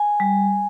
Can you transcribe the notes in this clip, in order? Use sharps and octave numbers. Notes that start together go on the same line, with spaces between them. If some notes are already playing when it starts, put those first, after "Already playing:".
Already playing: G#5
G3